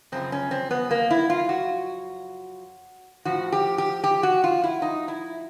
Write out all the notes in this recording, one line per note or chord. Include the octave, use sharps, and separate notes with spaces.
F#2 C#3 F3 C4
C#4
C4
B3
A#3
E4
F4
F#4
A2 F3 F#4
G4
G4
G4
F#4
F4
E4
D#4
E4